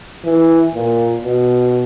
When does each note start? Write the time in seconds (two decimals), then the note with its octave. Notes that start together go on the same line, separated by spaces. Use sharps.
0.25 E3
0.74 A#2
1.22 B2